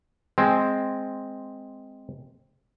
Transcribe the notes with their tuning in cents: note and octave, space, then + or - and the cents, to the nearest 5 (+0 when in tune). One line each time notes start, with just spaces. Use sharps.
G#3 +5 C4 +0